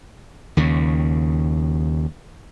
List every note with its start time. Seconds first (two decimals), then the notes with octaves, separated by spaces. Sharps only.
0.57 D#2 C#3